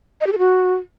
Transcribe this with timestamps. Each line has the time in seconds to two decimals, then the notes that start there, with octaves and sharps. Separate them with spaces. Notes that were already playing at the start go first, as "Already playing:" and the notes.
0.21 D#5
0.27 G4
0.32 A4
0.38 F#4